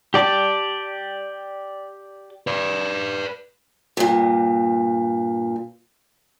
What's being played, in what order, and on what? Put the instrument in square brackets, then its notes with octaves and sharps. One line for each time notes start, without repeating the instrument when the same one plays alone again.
[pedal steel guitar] G4 D5 A5
[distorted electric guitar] B4 D5
[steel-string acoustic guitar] G2 A#2